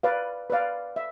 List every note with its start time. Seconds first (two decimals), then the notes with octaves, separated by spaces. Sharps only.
0.03 B4 D5 F5
0.50 B4 D5 F5
0.96 E5